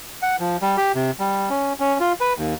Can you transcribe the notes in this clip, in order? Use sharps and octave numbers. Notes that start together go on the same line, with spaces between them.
F#5
F3
G3
G4
C3
G3
C#4
C#4
F4
B4
D#2